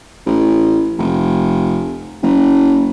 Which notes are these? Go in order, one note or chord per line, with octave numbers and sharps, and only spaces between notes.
A1
F1
F#1